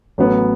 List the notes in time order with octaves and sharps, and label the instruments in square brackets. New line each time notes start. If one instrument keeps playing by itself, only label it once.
[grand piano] A1 A2 F#3 B3